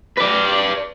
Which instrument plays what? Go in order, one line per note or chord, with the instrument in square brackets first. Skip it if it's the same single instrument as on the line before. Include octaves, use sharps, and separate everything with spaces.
[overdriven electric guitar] B4 D5